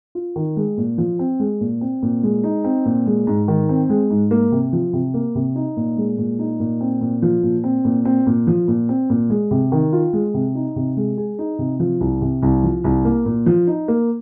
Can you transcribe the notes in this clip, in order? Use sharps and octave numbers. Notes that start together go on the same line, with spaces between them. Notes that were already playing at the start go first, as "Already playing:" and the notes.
F4
D#3
G#3
A#2
F3
C4
G#3
A#2
C4
A#2
G#3
D#4
C4
A#2
G#3
G#2
D#3
C4
G#3
G#2
A#3
C3
F3
C3
A#3
C3
D#4
A#2
G#3
A#2
D#4
A#2
C4
A#2
F3
A#2
C4
A#2
C4
A#2
F3
A#2
C4
A#2
G#3
C3
D#3
F4
G#3
C3
D#4
C3
G#3
G#4
D#4
C3
F3
C2
C3
C2
F3
C2
A#3
A#2
F3
D#4
A#3